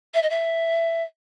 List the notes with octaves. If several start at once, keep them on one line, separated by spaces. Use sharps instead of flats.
E5
D#5
E5